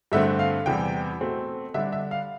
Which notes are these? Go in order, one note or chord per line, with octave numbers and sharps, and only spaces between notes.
G2 D3 A3 C4 E5
F5
E2 C3 E3 G3 G5
B2 A3 C4
D3 G3 D4 E5
E5
F5